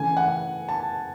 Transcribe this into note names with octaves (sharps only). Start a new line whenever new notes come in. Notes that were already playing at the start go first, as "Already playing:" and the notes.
Already playing: C#3 E3 A3 G#5
F#5
A5